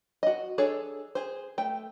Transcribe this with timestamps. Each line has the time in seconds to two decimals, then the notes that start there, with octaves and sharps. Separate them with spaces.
0.23 F#4 D#5
0.58 D4 G#4 A4 C#5
1.15 G#4 C5
1.58 A3 G5